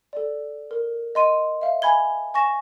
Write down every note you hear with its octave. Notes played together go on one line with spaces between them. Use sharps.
A4 D5
A#4
D#5 C6 D#7
E5 F5
G#5 B5 G#6 G7
G#5 C#6 A#6 E7